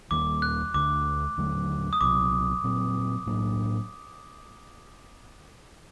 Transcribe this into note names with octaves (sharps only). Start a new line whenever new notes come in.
D#2 D#3 G3 A#3 D6
F#6
D2 D3 A3 D6
D#2 D3 F#3 A3
D#6
C2 C3 F#3 D6
A#2 F#3 C4
A2 F#3 A#3 D4